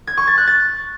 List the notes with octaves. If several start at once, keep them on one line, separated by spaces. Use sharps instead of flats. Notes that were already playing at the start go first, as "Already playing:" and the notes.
G#6
C#6
A6
F#6
A6